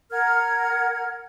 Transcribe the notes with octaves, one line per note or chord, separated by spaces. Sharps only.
A#4 F#5 F6 G#6